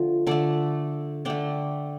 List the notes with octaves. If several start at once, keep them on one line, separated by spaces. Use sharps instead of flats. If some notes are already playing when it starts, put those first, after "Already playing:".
Already playing: D3 F3 A3 F4
D3 A3 A4 D5
D3 A3 D5 G5